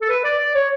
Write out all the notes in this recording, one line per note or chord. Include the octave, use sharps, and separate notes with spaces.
A4
B4
D5
D5
C#5